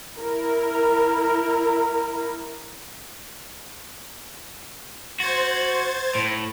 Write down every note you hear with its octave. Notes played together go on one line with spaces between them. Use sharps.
E4 A#4
F#4 C5 G#6 A6
A2